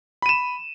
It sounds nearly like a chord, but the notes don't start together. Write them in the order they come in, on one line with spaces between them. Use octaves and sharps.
B5 D#7 E7